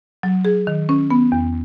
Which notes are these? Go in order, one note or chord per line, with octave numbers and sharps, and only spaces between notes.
F#3
G#4
D#3
C#4
B3
E2